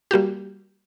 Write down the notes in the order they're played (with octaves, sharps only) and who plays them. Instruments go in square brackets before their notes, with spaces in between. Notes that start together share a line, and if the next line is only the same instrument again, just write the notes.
[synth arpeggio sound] G3 A#3 F#4 G4